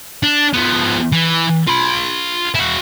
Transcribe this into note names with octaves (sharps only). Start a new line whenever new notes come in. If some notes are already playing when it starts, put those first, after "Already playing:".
D4
F3 B3
E3
F4 B5
E4 F#4